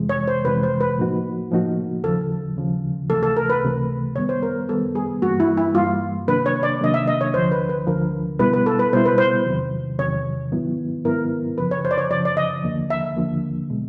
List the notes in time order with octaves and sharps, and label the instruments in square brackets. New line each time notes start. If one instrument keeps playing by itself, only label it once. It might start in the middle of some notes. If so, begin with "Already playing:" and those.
Already playing: [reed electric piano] F2 C3 E3 G#3
[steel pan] C#5
C5
[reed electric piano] F2 C3 E3 G#3 [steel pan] B4
[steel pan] C5
B4
[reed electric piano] A2 F3 A#3 D#4 F#4
A2 F3 A#3 D#4 F#4
[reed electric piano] D#2 C#3 F3 [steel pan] A4
[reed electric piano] D#2 C#3 F3
[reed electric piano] C#2 C3 E3 A3 [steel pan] A4
[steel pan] A4
A#4
B4
[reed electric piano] C#2 C3 E3 A3
[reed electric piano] F#2 D#3 G3 B3 [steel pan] C#5
[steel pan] C5
A#4
[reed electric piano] F#2 D#3 G3 B3 [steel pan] A4
[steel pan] G#4
[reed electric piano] G2 E3 G3 A#3 [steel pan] F#4
[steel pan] E4
E4
[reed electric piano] G2 E3 G3 A#3 [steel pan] F4
[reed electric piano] C3 D#3 F#3 A#3 D4 [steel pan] B4
[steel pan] C#5
D5
[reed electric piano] C3 D#3 F#3 A#3 D4 [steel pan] D#5
[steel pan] E5
D#5
C#5
[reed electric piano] D2 D3 F3 [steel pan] C5
[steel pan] B4
B4
[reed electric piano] D2 D3 F3 [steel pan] A#4
[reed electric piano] B2 G3 B3 E4 [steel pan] B4
[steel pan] B4
A4
B4
[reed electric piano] B2 G3 B3 E4 [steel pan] C5
[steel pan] B4
C5
[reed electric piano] E2 C3 D#3 F#3
[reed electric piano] E2 C3 D#3 F#3 [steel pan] C#5
[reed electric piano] G#2 D#3 F#3 B3 E4
[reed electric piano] G#2 D#3 F#3 B3 E4 [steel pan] A#4
[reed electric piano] F#2 C#3 F3 [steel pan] B4
[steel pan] C#5
C5
D5
C#5
[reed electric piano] F#2 C#3 F3 [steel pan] D5
[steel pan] D5
D#5
[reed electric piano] D#2 D3 F3 A#3
[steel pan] E5
[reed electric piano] D#2 D3 F3 A#3
B2 G#3